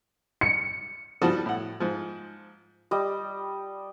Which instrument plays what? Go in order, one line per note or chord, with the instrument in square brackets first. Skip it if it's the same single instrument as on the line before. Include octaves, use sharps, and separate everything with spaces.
[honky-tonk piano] C#7
[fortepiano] F3 G3 F#4 F#5 A5 D#6
A2 F#5
G#2 F3
[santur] G3 D#5